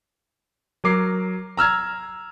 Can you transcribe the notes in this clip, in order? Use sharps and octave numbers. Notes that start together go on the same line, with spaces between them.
F#3 A#4 D6 C7
A#5 E6 F6 G#6